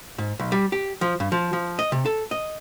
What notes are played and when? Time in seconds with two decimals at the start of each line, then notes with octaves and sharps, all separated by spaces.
0.18 G#2
0.39 B1
0.52 G3
0.72 G4
1.01 F3
1.20 G2
1.32 F3
1.53 F3
1.79 D#5
1.92 C3
2.06 A4
2.31 D#5